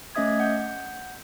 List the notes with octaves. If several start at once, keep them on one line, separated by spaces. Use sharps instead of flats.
A3 C#4 D#5 E5 D#6 G#6
F#5 G6